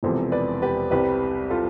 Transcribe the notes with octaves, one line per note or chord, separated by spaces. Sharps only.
E1 E2 C3 F3 A4 C5
B4 D5
G4 B4
C2 C3 G3 G4 B4
F4 A4